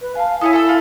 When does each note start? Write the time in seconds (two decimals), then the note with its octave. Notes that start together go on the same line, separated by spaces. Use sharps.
0.01 B4
0.15 F5 G#5 A5
0.41 E4 A4 C#5 G#5 D#6
0.53 A4 E6
0.67 F4 A4